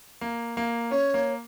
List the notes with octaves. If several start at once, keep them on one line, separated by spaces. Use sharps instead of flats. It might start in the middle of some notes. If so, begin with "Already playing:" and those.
A#3
A#3
C#4 C#5
A#3